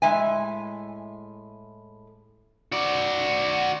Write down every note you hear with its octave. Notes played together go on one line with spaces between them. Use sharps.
A2 G#3 E5 G#5
F#4 D5